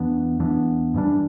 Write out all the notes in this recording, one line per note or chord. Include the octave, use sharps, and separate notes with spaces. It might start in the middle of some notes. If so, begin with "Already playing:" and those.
Already playing: E2 E3 B3 D4
E2 E3 B3 D4
G2 E3 G3 D4